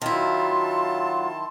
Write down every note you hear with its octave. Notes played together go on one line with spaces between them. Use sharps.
D#3 F#3 E4 F4 A5 C6